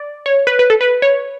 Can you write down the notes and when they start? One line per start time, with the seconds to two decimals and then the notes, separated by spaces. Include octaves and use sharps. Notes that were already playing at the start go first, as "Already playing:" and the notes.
Already playing: D5
0.26 C#5
0.47 B4
0.59 B4
0.70 A4
0.81 B4
1.02 C#5